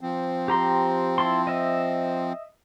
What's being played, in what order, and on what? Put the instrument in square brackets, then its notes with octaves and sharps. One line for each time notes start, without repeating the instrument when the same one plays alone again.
[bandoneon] F3 C4
[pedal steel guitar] G4 A#5 C6
E4 A5 C6
D#5 E5